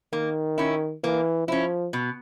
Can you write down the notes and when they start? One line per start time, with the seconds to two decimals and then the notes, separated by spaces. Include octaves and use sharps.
0.13 D#3 A#3
0.58 C#4 E4
1.04 E3 A#3
1.48 F3 C#4 E4
1.93 B2